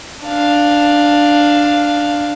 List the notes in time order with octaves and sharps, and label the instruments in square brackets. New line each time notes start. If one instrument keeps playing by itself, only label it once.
[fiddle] D4 F5